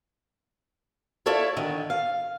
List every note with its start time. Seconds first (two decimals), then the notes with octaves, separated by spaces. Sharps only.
1.26 E4 F4 A4 C#5 D5 E5
1.57 D3 D#3 D#5
1.90 F5